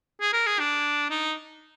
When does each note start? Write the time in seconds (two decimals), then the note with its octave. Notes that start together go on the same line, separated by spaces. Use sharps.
0.21 G#4
0.33 A#4
0.46 G#4
0.60 D4
1.10 D#4